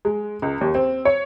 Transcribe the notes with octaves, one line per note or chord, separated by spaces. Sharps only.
G#3
C#2
D#2
C4
C#5